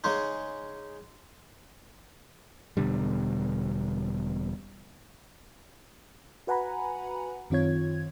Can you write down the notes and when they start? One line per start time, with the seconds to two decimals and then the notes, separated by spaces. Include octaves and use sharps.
0.04 C#3 G#3 D#4
2.77 E1 B2 D3 G3
6.47 F#4 B4 F#5 G#5 A#5 B5
7.50 F#2 D#3 C4 F4 C#5 G#6